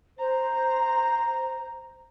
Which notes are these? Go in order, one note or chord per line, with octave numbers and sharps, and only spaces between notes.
C5 A#5